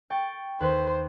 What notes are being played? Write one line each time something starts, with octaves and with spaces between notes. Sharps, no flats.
G5 C#6 A6
D#2 B4 C5